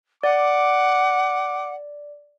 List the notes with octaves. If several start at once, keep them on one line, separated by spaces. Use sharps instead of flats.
D5 F#5 D6